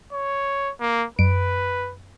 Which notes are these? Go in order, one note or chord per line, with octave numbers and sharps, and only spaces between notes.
C#5
A#3
F#2 B4 D7